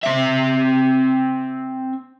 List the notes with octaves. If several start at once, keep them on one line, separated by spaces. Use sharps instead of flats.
C4 E5